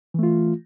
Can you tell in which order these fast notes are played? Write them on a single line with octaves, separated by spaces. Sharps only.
E3 A3 F4